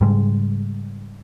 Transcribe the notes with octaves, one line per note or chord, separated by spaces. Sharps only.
G#2 C#3 G3 G#3